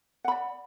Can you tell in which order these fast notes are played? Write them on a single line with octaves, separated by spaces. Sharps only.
F#5 B5 D5